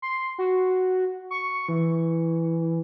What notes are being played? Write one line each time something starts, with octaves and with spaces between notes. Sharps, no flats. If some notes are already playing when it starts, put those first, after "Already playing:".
C6
F#4
C#6
E3